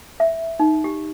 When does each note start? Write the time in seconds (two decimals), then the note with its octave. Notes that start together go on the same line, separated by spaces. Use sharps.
0.20 E5
0.59 D#4
0.84 G4